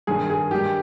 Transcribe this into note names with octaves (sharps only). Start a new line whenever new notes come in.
G2 D#3 G#4
G#4
G2 D#3 G4